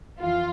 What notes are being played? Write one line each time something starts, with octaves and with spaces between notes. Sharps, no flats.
F2 E3 F4